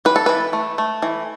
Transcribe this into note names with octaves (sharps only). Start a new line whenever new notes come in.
E3 B4
A4
E3 B4
A3
A3
E3